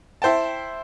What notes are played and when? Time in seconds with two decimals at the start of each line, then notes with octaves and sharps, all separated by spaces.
0.22 E4 C5 G5 A5